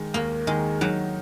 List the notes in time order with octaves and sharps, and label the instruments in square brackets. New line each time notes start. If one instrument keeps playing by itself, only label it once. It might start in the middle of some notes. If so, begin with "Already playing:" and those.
Already playing: [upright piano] D#3 G#3
[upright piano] D#2 [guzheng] A#3
[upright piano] D#3 [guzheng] G#3
[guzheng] F#3 [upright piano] D#4